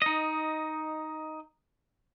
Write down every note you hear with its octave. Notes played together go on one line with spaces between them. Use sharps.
D#4 D#5